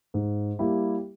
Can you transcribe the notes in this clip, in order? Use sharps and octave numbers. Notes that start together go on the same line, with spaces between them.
G#2
G3 A#3 E4 G4